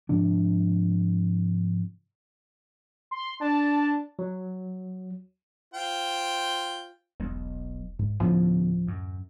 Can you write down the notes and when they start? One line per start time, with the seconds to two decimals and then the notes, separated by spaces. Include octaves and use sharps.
0.09 G#2 C3 F3 D4
3.11 C6
3.41 D4 A5
4.19 F#3
5.74 F4 C5 G5
7.20 E1 B1
7.99 G#2
8.20 F1 D2 A2 D3 F3 B3 C#4
8.87 F#2